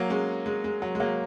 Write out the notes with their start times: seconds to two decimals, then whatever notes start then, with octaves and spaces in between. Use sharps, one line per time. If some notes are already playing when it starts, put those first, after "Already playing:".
Already playing: F#3 A#3
0.10 G#3 C#4
0.46 G#3
0.64 G#3
0.82 F#3
0.95 G#3
1.00 F#3 A#3